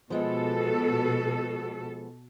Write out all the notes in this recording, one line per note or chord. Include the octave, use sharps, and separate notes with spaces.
B2 F3 G#3 B3 A4